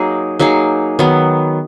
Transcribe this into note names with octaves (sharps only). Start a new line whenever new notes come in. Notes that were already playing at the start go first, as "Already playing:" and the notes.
Already playing: F#3 A#3 D#4 G#4
F#3 A#3 D#4 G#4
D#3 F#3 B3